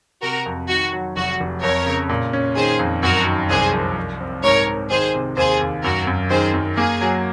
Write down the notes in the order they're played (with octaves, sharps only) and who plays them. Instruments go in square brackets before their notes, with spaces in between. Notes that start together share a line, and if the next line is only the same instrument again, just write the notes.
[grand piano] C3 [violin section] F#4 A#4
[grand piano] F2
[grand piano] D#3 [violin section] F#4
[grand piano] F#3
[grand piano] F1 [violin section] F#4
[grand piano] F1
[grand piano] F2 [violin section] A#4 C#5
[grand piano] C#3
A#2
C#4
[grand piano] D#3 [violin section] G#4 C5
[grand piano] F2
[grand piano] F#2 [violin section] F#4 A#4
[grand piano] D#3
[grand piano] C2 [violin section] G#4 C5
[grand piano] F3
C2
C4
[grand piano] G#2 [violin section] A#4 C#5
[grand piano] C4
[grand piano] D#3 [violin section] G#4 C5
[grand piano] C3
[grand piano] D#2 [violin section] G#4 C5
[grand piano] D#2
[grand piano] F#2 [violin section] F#4 A#4
[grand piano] F#2
[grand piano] D#3 [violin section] G#4 C5
[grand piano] F#2
[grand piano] A#3 [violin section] G#4
[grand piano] F#3